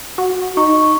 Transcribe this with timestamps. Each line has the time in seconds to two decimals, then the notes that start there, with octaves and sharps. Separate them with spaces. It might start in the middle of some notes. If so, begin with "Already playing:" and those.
0.18 F#4
0.57 D#4 C#6